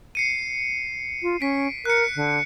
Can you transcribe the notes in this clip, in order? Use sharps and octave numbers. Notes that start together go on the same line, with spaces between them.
C7 C#7 D#7
F4
C#4 B6 D7
A#4 F#6 C#7
D3